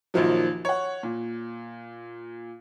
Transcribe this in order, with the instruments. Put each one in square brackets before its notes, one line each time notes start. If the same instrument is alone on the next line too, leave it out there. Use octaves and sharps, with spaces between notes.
[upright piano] A#1 D#3 F3 F#3
C#5 F#5
A#2